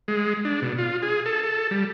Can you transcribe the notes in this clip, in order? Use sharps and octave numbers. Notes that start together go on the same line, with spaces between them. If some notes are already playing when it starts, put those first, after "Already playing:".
G#3
D4
B2
F4
G#4
A4
A4
G3